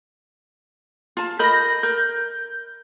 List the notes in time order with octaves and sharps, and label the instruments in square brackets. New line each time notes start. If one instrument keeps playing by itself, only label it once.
[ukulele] F4 A5
[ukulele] A#4 D#5 B5 [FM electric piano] G6 A#6
[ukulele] A#4 [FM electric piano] G6